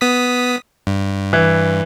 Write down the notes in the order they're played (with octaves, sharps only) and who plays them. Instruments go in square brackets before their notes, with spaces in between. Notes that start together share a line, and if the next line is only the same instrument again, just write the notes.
[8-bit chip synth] B3 D#6 B6
G2
[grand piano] E3